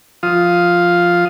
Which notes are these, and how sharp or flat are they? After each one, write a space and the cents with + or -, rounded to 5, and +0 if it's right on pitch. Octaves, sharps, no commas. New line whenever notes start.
F3 +0 F4 +0 D#6 +5